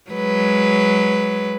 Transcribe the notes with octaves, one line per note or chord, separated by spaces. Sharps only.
F#3 G#3 B4